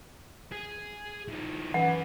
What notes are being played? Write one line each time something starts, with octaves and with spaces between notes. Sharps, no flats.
G#4
D#3 F3
E3 F#3 C#4 F#5